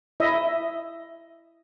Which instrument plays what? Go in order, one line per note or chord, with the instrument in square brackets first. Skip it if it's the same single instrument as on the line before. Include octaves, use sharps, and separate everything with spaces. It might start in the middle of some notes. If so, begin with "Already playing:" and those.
[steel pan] E4 D#5 E5